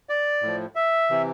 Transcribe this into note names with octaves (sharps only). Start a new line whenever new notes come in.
D5
A2 F3
E5
C3 E3